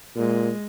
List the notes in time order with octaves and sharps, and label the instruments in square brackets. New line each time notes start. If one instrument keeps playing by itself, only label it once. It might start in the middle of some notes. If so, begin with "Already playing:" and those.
[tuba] A#2 [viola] G#3